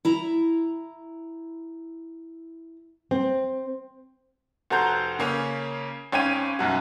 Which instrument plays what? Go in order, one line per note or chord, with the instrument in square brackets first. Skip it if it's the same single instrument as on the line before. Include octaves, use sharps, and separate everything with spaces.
[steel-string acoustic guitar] E4 A#5
[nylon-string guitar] C4
[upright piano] F1 F#4 A4 C5 A#5 G6
C#3 A#3 C#4
G#1 C#4 G5 G#6 D#7
B1 F#2 F#4